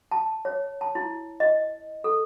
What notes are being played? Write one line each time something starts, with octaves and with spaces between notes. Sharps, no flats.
A5
C#5
A5
E4
D#5
A4